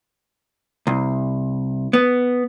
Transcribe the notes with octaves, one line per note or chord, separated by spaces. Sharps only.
C2
B3